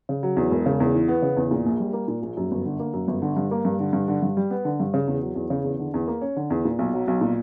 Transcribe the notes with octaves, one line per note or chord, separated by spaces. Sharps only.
C#3
F#3
E2
E1
C#3
E2
E3
B3
C#3
E2
A#2
A#1
G3
A#3
A#2
A#1
F#2
G1
D3
A#3
F#2
G1
D3
G2
A#3
G2
D3
G2
D3
G2
G3
B3
D3
G2
C#3
E2
F#3
E2
C#3
E2
D3
E2
A#3
C#4
D3
E2
A#2
B1
F#3
B1
A#2